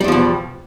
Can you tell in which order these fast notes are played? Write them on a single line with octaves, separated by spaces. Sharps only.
G3 E2 F3 B2